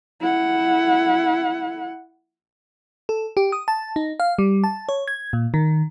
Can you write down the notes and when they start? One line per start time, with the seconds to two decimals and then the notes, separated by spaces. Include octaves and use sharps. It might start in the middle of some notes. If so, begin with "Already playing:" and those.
0.21 E4 F#5
3.09 A4
3.37 G4
3.52 D#6
3.68 A5
3.96 D#4
4.20 F5
4.38 G3
4.64 A5
4.89 C#5
5.08 G#6
5.33 A#2
5.54 D#3